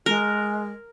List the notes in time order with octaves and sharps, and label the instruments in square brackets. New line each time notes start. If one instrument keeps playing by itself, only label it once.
[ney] G#3 [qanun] A#4